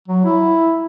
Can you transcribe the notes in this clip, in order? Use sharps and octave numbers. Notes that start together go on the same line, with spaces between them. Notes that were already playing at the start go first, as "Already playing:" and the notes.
F#3
E4